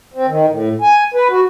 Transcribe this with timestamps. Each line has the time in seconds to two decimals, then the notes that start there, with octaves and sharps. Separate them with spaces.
0.14 C4
0.27 D#3
0.48 A2
0.81 G#5
1.14 B4
1.30 F#4